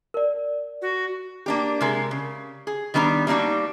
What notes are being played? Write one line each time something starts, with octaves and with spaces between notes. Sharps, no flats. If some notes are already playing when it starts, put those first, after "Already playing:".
A#4 D5
F#4
A#3 D4 G4
C3 G#3 A#4
C#3
G#4
D#3 G3 B3 D4 A#5
G3 A#3 D4 D#4 F#4